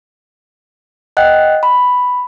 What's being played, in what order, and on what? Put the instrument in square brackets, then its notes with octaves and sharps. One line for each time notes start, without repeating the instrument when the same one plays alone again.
[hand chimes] D#5 F#5 G5 F#6
B5